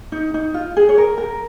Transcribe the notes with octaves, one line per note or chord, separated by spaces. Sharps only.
D#4
D#4
F4
G#4
C#5
A#4
A#4